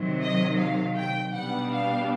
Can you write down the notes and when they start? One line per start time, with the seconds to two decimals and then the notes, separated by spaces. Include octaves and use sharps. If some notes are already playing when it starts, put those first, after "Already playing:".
Already playing: C3 D#3 F#3
0.22 D#5
0.58 F5
0.96 G5
1.33 B2 G3 B3 D4 F#5
1.72 F5